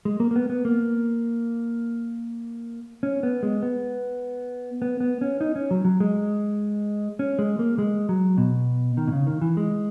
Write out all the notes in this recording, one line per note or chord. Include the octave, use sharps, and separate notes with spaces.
G#3
A#3
A#3
B3
B3
A#3
C#4
B3
G#3
B3
B3
B3
C#4
D#4
C#4
F#3
F#3
G#3
C#4
G#3
A#3
G#3
F#3
B2
D#3
B2
C#3
D#3
E3
G#3